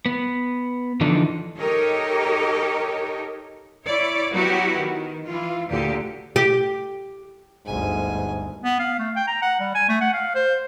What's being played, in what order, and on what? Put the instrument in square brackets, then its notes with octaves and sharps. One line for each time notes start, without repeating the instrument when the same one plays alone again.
[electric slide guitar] B3
D3 E3 F3 D4 D#4 A4
[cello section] D#4 G4 A4 A#4 C#5 D#5
E4 C#5 D5
F#3 B3 E4 F#4 G4
D#3
E3 F4
D2 A#2 D3 G4
[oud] G4
[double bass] G1 D2 [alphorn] G#2 [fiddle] G#5
[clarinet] B3
F5
A3
G5
A#5
F#5
G3
G#5
A3
F#5
F5
C5